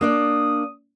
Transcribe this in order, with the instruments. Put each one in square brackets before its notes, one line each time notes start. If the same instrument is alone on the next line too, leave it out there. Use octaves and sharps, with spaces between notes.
[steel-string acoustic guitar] A#3 D4 D5 [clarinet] D#6